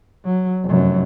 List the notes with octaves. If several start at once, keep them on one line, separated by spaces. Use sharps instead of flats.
F#3
F1 F#2